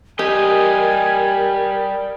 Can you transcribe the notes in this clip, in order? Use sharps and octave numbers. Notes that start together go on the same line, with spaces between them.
G3 G4 A#4 D#5 G#5